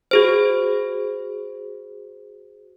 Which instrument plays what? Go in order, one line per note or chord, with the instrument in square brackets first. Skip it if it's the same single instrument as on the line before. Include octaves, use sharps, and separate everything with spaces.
[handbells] F#4 G#4 C5